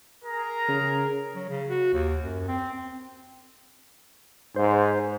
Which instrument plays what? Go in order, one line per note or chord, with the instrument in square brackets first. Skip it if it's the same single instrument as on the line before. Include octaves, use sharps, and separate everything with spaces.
[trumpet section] G#4 A#5 [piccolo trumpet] A#4
[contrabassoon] C#3
[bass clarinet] F#3
C#3
F#4
D#2
F#2
C4
[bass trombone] G#2 [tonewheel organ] C5